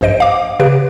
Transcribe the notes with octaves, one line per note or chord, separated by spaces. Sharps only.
A#1 G2 C5 D#5 D7
F5 D6
C#3 G4 B4 D7